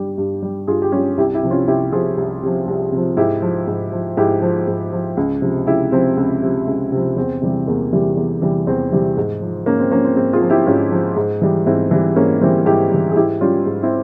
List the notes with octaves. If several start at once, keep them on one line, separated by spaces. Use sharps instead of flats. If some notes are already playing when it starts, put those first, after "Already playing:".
Already playing: G2 G3
G2
G3
G2 F4 G#4
G4
G3 C#4 F4
C2 E4 G4
E4 G4
C3 F3
C#4 F4
C2 E4 G4
C3 F3 F4 G#4
C2
C3 F3
C2
C3 F3
G#2 E4 G4
F3
G#2
F3
G#2 E4 G4
F3
G#2
F3
C#2
C3 F3
C#2 E4 G4
C3 F3 C4
C#2
C3 F3
C#2
C3 F3
E2 C4
C3 E3 G3
E2 A#3
C3 E3 G3
E2
C3 E3 G3
E2 C4
C3 E3 G3
G#2
F3
G#2 A#3 C#4
C4
F3 A#3 C#4
C4
G#2 C4
F4 G#4
F3
E4 G4
G#2 C#4 F4
F3
G#2
E3 G3
G#2 C4 E4
E3 G3
G#2 A#3 C#4
E3 G3 C4
G#2 E4 G4
E3 G3
G#4
G#2 E4 G4
G3 C#4 F4
G#2
C4 E4